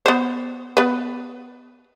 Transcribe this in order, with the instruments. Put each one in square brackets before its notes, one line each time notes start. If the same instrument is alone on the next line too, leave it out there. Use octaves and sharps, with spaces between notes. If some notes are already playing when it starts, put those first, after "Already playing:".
[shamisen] B3 C5
B3 B4